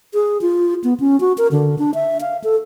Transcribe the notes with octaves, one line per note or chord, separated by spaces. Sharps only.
G#4
F4
B3
C#4
F#4
A#4
D3
D4
E5
F5
A4